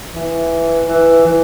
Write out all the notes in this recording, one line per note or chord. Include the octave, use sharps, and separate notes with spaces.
E3
E3
E3